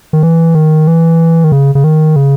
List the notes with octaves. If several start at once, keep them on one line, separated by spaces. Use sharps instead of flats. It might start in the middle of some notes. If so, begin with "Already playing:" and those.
D#3
E3
D#3
E3
D#3
C#3
C#3
D#3
C#3